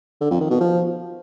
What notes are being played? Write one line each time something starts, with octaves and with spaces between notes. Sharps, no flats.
D3
F2
D#3
B2
F3